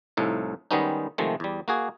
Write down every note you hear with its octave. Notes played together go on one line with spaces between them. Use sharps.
C2 A2 F3 D#4
D#3 G3 G#3 B3 C#4 D#4
C3 D#3 F3 G#3 A3
E2 G3
A#3 F#4 G#4